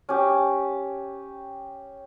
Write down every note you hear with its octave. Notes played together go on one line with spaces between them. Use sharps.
C#4 G4